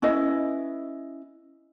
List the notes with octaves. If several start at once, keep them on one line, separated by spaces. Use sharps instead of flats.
C#4 E4 B4 D#5